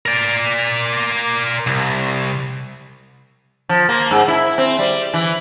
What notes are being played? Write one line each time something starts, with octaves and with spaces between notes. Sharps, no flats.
A#4 D5
C2
F3
A#3
G#2
E4
C4
G3
E3